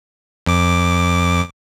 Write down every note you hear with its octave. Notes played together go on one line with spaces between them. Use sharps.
F2 D6